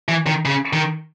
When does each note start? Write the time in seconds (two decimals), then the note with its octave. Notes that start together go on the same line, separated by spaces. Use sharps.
0.08 E3
0.26 D#3
0.45 C#3
0.73 D#3